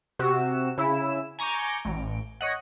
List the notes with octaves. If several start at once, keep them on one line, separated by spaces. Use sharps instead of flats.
C3 F#4 E6
C#3 E4 E6
G#5 A#5 C#6 D6 G6
A1 D7
C#5 D#5 F#5